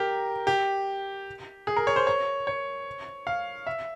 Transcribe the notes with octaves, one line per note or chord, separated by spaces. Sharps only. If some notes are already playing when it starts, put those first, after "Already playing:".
Already playing: G4 A#4
G4
G#4
A#4
C#5
C5
C#5
C#5
F5
E5